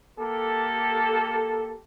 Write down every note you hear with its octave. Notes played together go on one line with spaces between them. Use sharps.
A#3 G4 A4